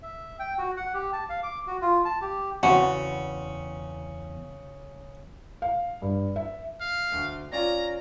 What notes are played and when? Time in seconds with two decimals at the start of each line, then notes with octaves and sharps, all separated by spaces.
0.02 E5
0.39 G5
0.58 F#4
0.77 F#5
0.94 G4
1.13 A5
1.29 F5
1.43 D6
1.67 F#4
1.81 F4
2.05 A5
2.21 G4
2.63 E2 C#3 B3 C4 F#4
5.62 F5
6.02 G2
6.36 E5
6.81 F5
7.12 D2
7.52 C#4 F4 D5 A#5